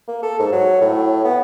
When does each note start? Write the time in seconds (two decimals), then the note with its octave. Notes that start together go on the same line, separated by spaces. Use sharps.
0.08 A#3
0.23 A4
0.39 G#2
0.52 F#3
0.81 A2
1.25 B3